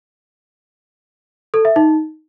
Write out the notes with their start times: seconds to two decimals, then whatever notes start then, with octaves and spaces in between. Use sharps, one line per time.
1.54 A4
1.65 E5
1.76 D#4